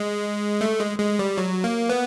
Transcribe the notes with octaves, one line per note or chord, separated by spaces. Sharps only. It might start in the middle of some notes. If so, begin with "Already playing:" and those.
Already playing: G#3
A3
G#3
G#3
G3
F#3
A#3
B3